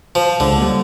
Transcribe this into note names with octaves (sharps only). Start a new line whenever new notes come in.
F3
C#2 D3
G3 A#3